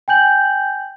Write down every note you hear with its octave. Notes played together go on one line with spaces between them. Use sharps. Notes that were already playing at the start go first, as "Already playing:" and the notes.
G5 G#5 G6 F#7